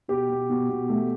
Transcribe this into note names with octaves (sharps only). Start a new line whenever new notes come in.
B2 G4
B2
B2
B2
A3